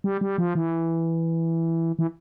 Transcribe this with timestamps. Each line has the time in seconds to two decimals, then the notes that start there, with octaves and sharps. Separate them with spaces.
0.04 G3
0.21 G3
0.38 F3
0.55 E3
1.99 E3